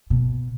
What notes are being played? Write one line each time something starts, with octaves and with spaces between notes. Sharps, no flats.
B2